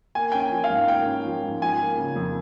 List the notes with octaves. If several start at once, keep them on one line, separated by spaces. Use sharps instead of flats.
A#3 G#5
C#4 G5
G#5
F3
F5
G#2
A#3 G5
C#4
F3
G#2
F3 G#5
A#3
C#3
F2